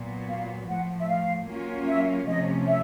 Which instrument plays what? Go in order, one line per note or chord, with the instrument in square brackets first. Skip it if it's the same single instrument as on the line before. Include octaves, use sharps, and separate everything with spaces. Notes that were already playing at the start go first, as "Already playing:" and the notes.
Already playing: [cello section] A#2 F#3 B3
[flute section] F5
[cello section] A2 F3 A3 [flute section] F#5
[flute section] E5
F5
[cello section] F#3 A#3 C#4 F4
[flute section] E5
[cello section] C3 F3 A3 C#4 [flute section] D#5
[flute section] E5